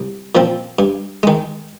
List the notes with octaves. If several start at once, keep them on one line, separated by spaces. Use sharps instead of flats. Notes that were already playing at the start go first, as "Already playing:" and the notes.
Already playing: C2
A#2 F3 C4
G2
D#3 G#3